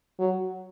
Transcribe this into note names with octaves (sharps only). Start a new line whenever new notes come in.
F#3